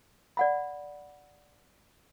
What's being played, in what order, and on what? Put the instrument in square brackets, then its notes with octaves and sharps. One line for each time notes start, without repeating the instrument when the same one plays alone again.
[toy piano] D5 F#5 B5